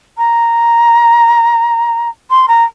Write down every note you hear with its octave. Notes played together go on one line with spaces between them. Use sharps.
A#5
C6
A#5